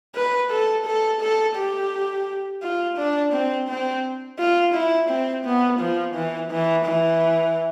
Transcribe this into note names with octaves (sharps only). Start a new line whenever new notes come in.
B4
A4
A4
A4
G4
F4
D4
C4
C4
F4
E4
C4
B3
F3
E3
E3
E3